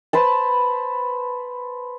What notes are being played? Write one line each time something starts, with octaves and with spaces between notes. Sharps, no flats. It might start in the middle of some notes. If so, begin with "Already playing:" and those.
B4 C5 A5